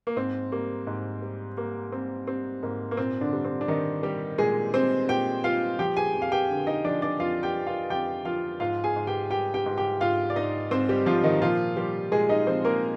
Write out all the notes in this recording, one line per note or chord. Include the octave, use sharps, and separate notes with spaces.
A#3
G#2 C4
G3 A#3
G#2
G3
G3 A#3
G3 C4
G3 C4
G#2 A#3
A#3
A#2 C4
D3 D4
G3
C4
D4
D#3 G3 D#4
G3 G4
A#2 G#3 G#4
G3 C4 C5
A#2 G4 G5
G3 F4 F5
F3 G4 G5
G#4 G#5
F2
F5
G4 G5
D3
D#4 D#5
F3 D4 D5
D4 D5
F2 F4 F5
G4 G5
F3
F4 F5
F2 G4 G5
F3 F4 F5
G#2 F4 F5
G#4 G#5
G#2
G4 G5
G3 G4 G5
G4 G5
G#2
G4 G5
G#2 F4 F5
D5
G#2 D#4 D#5
G#2 C4 C5
G3 G4
G#2 F3 F4
D#3 D#4
A#2 F3 F4
F3 G3 G4
A#2 G#3 G#4
D#4 D#5
F3 C4 C5
A#3 A#4